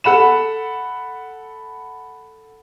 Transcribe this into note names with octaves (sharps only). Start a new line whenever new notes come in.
A4 F#5 B5 E7